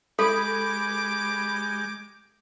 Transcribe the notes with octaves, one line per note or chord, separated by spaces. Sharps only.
G#3 G4 A4 B5 D6